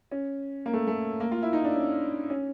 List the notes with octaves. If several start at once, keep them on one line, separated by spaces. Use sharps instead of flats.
C#4
A#3
A3
A3
A#3
F4
E4
D#4
D4
C#4
C#4